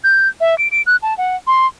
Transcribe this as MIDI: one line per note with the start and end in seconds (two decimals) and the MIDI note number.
0.04 0.28 91
0.41 0.57 76
0.58 0.68 98
0.72 0.82 98
0.86 0.96 90
1.03 1.16 81
1.18 1.36 78
1.47 1.67 84